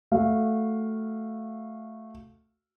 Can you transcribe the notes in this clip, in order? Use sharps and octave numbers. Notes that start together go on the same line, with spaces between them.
A3 F#4 F5